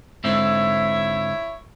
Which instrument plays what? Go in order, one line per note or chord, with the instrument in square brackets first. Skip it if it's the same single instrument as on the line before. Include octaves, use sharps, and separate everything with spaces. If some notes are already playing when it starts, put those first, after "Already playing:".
[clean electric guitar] G#2 D3 C4 [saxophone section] E4 C#5 E5